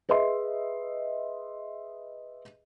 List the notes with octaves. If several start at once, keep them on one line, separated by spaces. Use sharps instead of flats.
G#4 B4 D#5 E5 C6